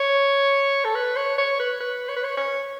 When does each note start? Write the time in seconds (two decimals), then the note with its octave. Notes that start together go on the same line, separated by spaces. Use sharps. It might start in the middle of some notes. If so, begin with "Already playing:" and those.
Already playing: C#5
0.85 A4
0.95 B4
1.16 C#5
1.38 C#5
1.59 B4
1.80 B4
2.08 C#5
2.16 B4
2.24 C#5
2.37 C#5